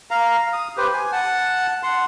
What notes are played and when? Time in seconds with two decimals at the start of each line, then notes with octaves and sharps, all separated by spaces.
0.11 F5 A#5
0.53 D#6
0.77 G4 B4 C5
0.94 G#5
1.12 F#5 A5
1.83 F#5 C6